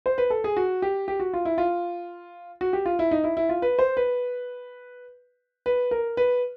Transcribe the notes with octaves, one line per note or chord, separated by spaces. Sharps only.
C5
B4
A4
G#4
F#4
G4
G4
F#4
F4
E4
F4
F#4
G4
F4
E4
D#4
E4
E4
F4
B4
C5
B4
B4
A#4
B4